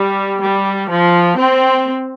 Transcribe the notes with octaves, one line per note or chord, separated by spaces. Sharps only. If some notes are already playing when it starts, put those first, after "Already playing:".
Already playing: G3
G3
F3
C4